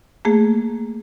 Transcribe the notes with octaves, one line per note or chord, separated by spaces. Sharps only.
A3 A#3 G#4